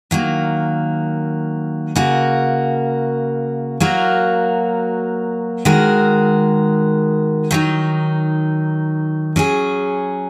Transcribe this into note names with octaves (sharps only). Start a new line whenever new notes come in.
D#3 F#3 A#3
C#3 A#3 F#4 A#4
F#3 A#3 F#4 A#4
D#3 G#3 F#4 A#4
D#3 F#3 D#4
F#3 C#4 G#4